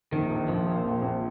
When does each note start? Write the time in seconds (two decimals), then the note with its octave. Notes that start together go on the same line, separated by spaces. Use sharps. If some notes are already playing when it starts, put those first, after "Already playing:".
0.12 A#1 D#3
0.30 A#1
0.48 A#1 F3
0.67 A#2
0.84 A#1
1.02 A#1